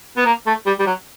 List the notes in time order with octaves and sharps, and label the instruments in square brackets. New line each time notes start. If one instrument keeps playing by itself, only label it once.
[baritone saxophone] B3
A#3
A3
G3
G3
F#3